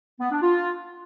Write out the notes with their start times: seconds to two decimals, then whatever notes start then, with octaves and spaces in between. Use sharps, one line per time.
0.20 B3
0.31 D4
0.42 F4